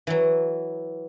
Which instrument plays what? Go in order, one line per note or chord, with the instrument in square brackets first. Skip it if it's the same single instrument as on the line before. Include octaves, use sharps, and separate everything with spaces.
[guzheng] E3 F#3